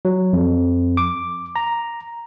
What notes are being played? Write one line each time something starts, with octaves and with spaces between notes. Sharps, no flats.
F#3
F2
D6
A#5